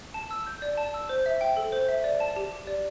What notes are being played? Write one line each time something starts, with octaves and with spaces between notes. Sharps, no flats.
A5
E6
G6
D5
A5
E6
C5
E5
G5
A4
C5
E5
D5
A5
G4
G4
D5